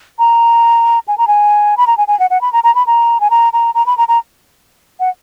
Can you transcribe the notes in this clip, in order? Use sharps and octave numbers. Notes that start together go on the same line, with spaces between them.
A#5
G#5
A#5
G#5
B5
A#5
G#5
G#5
F#5
F#5
B5
A#5
A#5
B5
A#5
G#5
A#5
A#5
A#5
B5
A#5
A#5
F#5